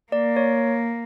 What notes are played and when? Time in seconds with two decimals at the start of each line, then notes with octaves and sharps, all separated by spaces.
0.12 A#3 D5
0.37 C#5